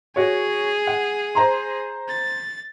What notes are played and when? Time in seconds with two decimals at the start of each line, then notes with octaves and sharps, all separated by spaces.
0.16 F#4 G#4 C#5
0.87 F#5
1.35 C5 A#5 C6
2.08 A6